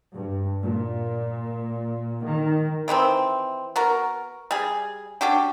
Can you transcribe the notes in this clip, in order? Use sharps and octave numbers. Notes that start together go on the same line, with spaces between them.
G2
A#2
D#3
C3 D#3 E3 C4
B3 F#4 A#4
G3 G#4
C#4 D4 F#4 G4